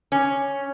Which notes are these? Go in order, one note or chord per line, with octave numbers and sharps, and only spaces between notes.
C#4